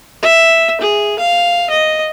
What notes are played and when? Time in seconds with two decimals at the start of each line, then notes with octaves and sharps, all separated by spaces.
0.22 E5
0.81 G#4
1.19 F5
1.70 D#5